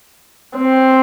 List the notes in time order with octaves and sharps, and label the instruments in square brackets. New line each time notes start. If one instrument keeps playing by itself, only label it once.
[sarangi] C4